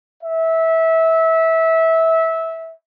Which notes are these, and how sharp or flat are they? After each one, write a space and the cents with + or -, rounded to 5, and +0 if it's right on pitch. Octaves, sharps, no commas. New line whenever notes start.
E5 -20